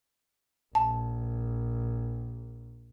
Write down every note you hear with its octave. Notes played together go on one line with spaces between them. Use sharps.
A#1 A5